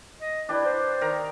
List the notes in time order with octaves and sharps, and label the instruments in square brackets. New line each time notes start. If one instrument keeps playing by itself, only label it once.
[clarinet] D#5
[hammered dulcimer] D4 G4 B4 [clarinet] E4
[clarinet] C5
[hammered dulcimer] D#3 A#4 A#5